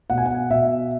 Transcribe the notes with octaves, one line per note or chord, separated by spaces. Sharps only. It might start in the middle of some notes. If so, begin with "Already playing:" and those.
B2 F#5
G#5
F#5
B2 E5